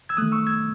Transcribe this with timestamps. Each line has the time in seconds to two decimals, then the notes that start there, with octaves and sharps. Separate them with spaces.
0.09 E6 G#6
0.17 D#3 A3 D#6 F#6
0.32 C#6 E6
0.47 E6 G#6